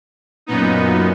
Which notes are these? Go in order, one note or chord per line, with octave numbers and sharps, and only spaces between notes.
F#2 A#2 B3 D#4